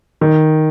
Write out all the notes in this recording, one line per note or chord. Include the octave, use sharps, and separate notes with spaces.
D#3